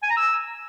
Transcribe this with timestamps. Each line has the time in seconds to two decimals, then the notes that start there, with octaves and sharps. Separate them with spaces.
0.03 G#5
0.10 A#5
0.17 E6